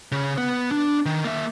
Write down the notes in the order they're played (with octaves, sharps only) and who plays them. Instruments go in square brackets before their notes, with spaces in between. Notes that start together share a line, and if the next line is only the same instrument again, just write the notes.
[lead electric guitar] C#3
B3
D4
D#3
A#3 E5